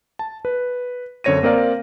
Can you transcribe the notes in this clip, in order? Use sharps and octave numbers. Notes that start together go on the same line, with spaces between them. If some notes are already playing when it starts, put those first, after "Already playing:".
A5
B4
F#2 D3 C4 C#5 A#6 D#7
A#3 C4 A#4 D5 F5